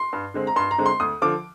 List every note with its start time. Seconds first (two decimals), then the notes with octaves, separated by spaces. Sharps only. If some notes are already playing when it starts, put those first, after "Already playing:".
Already playing: C6
0.13 G2
0.34 D3 G#3 C4
0.47 A#5
0.56 G2 C6
0.71 A#5
0.78 D3 G#3 C4
0.86 C6
1.00 D2 D#6
1.22 D3 F3 D6